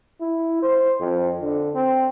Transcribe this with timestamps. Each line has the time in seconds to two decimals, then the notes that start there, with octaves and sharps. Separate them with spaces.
0.21 E4
0.63 C5
1.00 F2
1.41 D3
1.75 C4